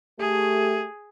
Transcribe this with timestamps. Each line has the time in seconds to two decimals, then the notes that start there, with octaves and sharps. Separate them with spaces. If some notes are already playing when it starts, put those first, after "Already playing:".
0.20 A3 G4 G#4